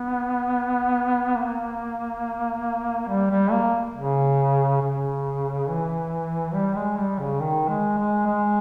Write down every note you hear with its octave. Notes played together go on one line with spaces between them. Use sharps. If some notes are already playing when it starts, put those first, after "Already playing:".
Already playing: B3
A#3
G3
G3
A#3
C#3
C#3
E3
G3
G#3
G3
C#3
D#3
G#3
G#3
G#3